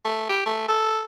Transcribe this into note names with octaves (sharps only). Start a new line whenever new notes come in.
A3
G4
A3
A4